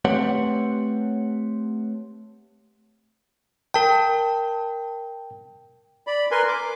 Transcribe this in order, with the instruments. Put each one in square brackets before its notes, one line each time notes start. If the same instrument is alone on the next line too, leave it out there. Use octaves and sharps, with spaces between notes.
[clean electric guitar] A3 C4 G4 B4 C#5 F#5
[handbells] A#4 A5 [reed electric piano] G5
[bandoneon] D5 B5
A#4 B4 G#5 C6
D6